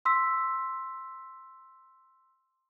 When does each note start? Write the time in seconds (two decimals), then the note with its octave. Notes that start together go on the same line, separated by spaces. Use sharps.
0.05 C6 E6 B6